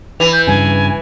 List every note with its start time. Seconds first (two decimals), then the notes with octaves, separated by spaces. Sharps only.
0.20 E3 F7
0.33 G6
0.47 G2 C#3 G#5